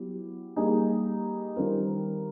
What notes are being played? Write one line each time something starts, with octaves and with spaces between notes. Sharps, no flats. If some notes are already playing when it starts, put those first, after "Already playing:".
Already playing: F#3 B3 E4 G4
G3 A#3 D#4 G#4
D#3 G3 C4 F4 A#4